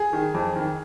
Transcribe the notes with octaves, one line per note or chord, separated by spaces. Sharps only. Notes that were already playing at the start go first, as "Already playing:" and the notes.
Already playing: G#4
D#3
F2
D#3